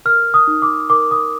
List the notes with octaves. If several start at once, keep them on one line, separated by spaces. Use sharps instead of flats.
A#4 F6
D#6
D#4
D6
A#4 D6
D#6